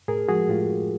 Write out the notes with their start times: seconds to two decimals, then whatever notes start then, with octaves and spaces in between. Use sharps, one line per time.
0.08 A2 G#4 A#4
0.29 F3 G#3 F#4 G#4
0.49 A2 F4 G4